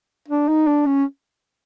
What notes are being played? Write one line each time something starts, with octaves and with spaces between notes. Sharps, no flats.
D4
D#4
D4
C#4